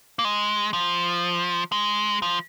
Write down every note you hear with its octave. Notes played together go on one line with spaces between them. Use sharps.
A#3
G#3
F3
G#3
F3